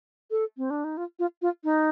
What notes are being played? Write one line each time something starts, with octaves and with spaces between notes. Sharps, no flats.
A4
C4
D4
D#4
F4
F4
F4
D#4